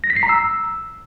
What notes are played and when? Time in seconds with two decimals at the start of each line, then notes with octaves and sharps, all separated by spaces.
0.04 A#6
0.10 B6
0.16 C7
0.23 A#5
0.29 E6